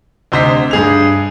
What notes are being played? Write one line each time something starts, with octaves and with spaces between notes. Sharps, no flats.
D2 C3 C5 D#5 B6
G2 G#4 F7